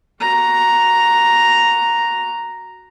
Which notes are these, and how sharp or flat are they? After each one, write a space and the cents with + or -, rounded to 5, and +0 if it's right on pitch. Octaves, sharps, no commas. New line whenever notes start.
F#4 +0 A#5 +0